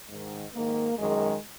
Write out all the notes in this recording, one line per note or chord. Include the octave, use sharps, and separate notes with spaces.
G#2 D#3
G#2 D#3 A#3
F#2 D#3 G#3